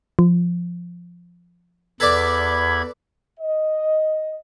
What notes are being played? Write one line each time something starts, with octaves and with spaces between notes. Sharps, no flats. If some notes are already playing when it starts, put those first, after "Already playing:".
F3
E2 A4 B4 D5 B5 G#6
D#5